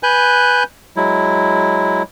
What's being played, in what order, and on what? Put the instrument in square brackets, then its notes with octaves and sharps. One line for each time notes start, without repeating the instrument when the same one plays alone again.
[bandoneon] B4 G#5 F#6 G6
F#3 G#3 E4